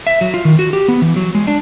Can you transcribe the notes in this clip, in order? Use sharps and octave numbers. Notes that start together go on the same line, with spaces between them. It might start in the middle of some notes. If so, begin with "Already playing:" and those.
E5
F#3
F4
D#3
F#4
G4
B3
E3
F#3
G#3
D4